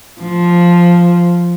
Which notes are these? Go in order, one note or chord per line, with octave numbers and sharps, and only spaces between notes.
F3